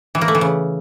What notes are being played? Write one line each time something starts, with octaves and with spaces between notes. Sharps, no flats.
E3
A#3
A3
E3
C#3